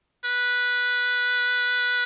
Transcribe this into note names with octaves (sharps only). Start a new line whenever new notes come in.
B4